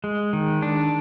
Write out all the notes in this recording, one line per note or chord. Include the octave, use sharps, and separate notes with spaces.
G#3
D#3
D4